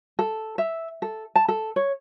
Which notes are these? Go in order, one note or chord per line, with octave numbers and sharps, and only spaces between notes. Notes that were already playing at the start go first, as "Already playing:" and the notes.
A4
E5
A4
A5
A4
C#5